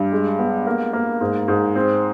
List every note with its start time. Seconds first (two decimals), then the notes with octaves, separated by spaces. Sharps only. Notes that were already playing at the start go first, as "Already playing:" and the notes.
Already playing: G2
0.12 G#3
0.39 B3
0.67 A#3
0.93 A#3
1.21 G#2
1.48 G#2
1.76 C4